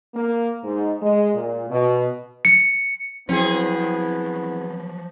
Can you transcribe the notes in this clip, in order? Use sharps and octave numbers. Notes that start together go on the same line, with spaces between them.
A#3
G#2
G#3
A#2
B2
C#7
F3 F#3 B3 C4 E4 G#4